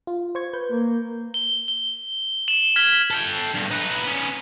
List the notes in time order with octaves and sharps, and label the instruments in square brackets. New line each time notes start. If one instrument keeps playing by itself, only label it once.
[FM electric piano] F4
C5 C#6 G#6
B4 G6
[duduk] A#3
[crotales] G7
G7
E7 F#7 G7
F6 G#6 B6 G7
[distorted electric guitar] A4 G5
G2 B2
D#4 B4
B3 C#4